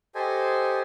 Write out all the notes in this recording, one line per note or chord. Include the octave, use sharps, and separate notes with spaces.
G4 A4 C5 D#5 G#5